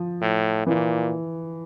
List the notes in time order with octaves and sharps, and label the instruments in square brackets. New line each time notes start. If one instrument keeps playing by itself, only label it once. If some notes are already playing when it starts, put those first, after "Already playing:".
Already playing: [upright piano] F3
[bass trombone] A2
[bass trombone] A#2 [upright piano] E3